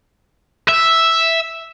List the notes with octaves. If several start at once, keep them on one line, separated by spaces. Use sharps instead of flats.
E5